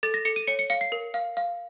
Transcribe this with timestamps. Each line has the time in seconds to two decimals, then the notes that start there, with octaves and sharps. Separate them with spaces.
0.03 A4 A6
0.14 A#6
0.25 A4 C#7
0.36 D#7
0.47 C#5 C#7
0.59 C#7
0.70 F5 C#7
0.81 C7
0.92 A#4
1.14 F5
1.37 F5